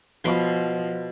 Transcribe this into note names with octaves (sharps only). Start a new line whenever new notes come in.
B2 F3 B5 C6